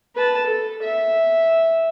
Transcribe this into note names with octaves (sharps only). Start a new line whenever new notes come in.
B4 A5
A4
E5